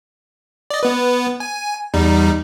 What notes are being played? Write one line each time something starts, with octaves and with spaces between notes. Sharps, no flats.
D5 D#5
B3 B4
G#5
E2 G3 D#4